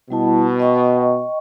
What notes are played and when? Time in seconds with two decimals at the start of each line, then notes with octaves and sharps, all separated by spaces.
0.10 B2 G3 E4 A5
0.60 D#5 G5 C#6